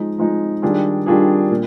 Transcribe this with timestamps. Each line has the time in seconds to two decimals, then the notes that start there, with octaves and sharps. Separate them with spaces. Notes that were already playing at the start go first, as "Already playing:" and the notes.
Already playing: F3 G#3 D#4
0.18 F3 G#3 D#4
0.62 D#3 G3 D4 F4 G#4
1.06 D#3 G3 D4 F4 G#4
1.51 A#2